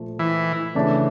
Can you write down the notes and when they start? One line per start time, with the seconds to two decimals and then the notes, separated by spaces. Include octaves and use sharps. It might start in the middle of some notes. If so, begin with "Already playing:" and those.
Already playing: A#2 F3 A3
0.19 E3
0.75 C#3 E3 A3 D4